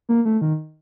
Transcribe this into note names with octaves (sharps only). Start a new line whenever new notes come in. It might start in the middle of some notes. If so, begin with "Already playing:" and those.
A#3
A3
D#3